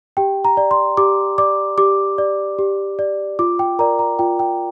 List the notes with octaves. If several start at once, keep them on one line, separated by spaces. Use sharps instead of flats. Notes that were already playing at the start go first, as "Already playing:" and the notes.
G4 G5
A#5
D5
C6
G4 D6
D5 D6
G4 D6
D5
G4
D5
F4 D6
G5
A#4 D5 A#5
A#5
F4 G5
G5